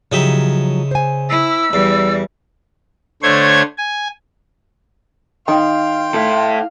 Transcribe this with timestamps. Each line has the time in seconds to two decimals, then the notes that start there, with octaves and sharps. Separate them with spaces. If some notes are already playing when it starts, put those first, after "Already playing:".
0.12 C#3 F3 F#3 D#4 G4 E5
0.91 C5 G#5
1.30 E4 E6
1.73 E2 E3 G3
3.23 D3 A3 C5 C#5 G#6
3.78 G#5
5.48 D#3 F5 G5 C6
6.14 E4 A4 F5